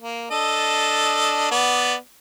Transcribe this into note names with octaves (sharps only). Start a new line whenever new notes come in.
A#3
D4 A4 D#5
B3 D5